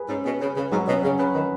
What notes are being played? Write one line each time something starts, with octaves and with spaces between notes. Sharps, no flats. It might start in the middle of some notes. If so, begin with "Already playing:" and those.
Already playing: G#4 B4
G#2 C#4
B2 G#4
C#3 B4
C#3 B4
G#2 F#3
B2 C#4
C#3 C#4
C#3 B4
D#3 B4